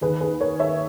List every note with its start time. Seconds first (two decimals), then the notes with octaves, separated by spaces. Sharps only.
0.01 D#2 D#3 G#4 B4
0.21 G#4 B4
0.41 A#4 C#5
0.59 C#5 E5